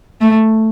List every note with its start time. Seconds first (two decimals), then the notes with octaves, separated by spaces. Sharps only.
0.21 A3